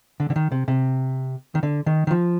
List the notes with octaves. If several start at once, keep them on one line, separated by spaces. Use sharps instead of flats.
D3
D3
D#3
C3
C3
D#3
D3
D#3
D#3
F3